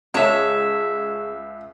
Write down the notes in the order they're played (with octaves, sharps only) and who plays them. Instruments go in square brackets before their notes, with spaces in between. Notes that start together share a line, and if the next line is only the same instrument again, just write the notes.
[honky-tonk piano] C#2 [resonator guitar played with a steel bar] G#3 A5 [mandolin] C#5 E5